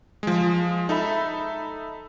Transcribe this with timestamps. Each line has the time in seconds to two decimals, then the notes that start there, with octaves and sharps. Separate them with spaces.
0.23 F3 G#3
0.89 D#4 A4 E5 B5